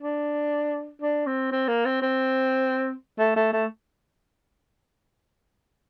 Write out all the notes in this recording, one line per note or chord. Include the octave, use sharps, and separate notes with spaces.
D4
D4
C4
C4
A#3
C4
C4
A3
A3
A3